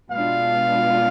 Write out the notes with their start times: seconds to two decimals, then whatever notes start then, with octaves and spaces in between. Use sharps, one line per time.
0.11 B2 G#3 B3 D4 F4 F5